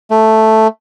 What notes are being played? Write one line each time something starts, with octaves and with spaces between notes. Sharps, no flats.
A3